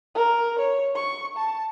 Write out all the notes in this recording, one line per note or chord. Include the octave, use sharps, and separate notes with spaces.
A#4
C#5
C#6
A5